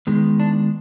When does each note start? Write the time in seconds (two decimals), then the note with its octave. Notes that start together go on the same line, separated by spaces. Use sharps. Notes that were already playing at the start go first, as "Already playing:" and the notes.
0.07 D#3 G#3 B3
0.40 D4